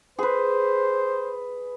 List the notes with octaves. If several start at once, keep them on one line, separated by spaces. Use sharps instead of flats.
G#4 B4 C5